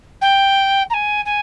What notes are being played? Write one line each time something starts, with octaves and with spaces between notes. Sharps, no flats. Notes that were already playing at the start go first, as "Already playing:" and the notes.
G5
A#5
G#5
G#5